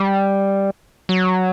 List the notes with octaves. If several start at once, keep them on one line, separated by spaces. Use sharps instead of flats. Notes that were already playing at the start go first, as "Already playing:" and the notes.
Already playing: G3
F#3